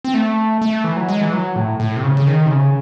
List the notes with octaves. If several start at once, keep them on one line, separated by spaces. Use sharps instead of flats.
C4
A3
A3
E3
F#3
G#3
E3
F#3
A2
A2
C3
C#3
C#3
D#3
C3
C#3